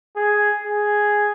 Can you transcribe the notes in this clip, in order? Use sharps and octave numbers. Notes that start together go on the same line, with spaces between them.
G#4
G#4